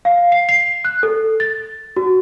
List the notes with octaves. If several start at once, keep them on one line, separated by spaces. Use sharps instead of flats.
F5
C7
C7
F#6
A4
A6
F#4